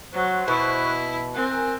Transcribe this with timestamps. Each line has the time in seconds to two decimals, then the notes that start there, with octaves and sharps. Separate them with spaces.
0.13 F#3 C5 C#6 F#6
0.48 B2 E4
1.34 C4 A#4 G#5 F#6